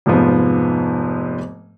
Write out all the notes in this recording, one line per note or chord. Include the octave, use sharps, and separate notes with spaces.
F1 G#2 F3 B3